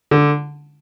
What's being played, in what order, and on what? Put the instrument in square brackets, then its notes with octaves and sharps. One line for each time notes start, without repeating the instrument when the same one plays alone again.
[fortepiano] D3